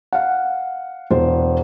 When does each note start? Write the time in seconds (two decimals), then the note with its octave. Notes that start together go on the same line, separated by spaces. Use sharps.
0.13 F5 F#5
1.10 E1 C5